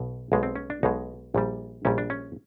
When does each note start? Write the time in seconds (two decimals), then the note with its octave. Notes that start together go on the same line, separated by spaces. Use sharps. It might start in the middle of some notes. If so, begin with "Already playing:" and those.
Already playing: B1 B2
0.32 B1 B2 G#3
0.43 C4
0.56 C#4
0.70 D4
0.83 B1 B2 G#3 D#4
1.35 A#1 A#2 G3
1.85 A#1 A#2 G3 C#4
1.98 D4
2.10 C#4